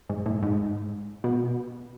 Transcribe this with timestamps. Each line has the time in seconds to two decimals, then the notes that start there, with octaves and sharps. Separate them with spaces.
0.09 G#2
0.26 A2
0.43 G#2
1.24 B2